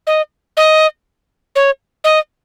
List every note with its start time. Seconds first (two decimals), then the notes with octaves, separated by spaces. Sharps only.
0.07 D#5
0.57 D#5
1.56 C#5
2.04 D#5